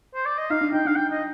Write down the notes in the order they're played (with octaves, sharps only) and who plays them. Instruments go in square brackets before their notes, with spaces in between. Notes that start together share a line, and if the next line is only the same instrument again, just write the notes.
[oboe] C5
D5
D#5
[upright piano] D#4 [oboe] F5
[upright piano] D4
[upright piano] D#4 [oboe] G5
[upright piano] D4 [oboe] F5
[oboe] G5
D#5